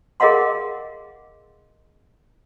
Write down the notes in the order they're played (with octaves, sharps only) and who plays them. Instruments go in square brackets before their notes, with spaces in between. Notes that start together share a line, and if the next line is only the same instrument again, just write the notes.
[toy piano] G#4 A#4 D#5 F5 F#5 C6